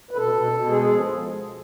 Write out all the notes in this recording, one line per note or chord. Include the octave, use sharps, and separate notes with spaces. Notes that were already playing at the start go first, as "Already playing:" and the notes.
B4
B2 A4
B2
B2
G#3 G#4
G#4
F3